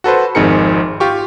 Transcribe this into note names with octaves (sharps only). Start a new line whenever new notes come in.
F#4 A4 B4 C5
G#1 F2 D#4 G#4 A#4 C#7
F4 G4 C#6